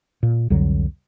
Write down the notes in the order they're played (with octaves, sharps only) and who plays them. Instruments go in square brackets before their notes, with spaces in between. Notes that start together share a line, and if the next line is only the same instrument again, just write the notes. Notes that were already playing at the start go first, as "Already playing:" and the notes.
[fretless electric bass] A#2
C2 F2 D3 F#3